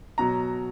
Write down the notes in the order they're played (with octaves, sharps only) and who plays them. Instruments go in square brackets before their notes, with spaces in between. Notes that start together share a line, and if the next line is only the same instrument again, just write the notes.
[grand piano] B2 F#3 A#5